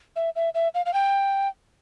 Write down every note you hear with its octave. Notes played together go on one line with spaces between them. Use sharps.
E5
E5
E5
F5
F5
G5